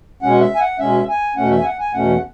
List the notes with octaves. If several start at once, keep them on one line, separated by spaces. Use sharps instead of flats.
B2 G#3 C#4 F#5
E5
G#5
F#5
B2 G#3 C#4 E5
G#5
E2 B2 A3 C#4 F#5
E5
G#5
F#5
G#5
E2 B2 A3 C#4 F#5